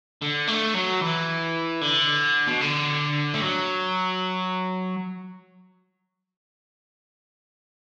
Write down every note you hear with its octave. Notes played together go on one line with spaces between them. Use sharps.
D3
A3
F#3
E3
D3
B2
D3
A3
F#3